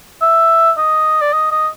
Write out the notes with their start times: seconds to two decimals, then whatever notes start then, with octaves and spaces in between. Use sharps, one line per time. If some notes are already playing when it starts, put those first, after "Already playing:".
0.22 E5
0.77 D#5
1.22 D5
1.33 D#5
1.51 D#5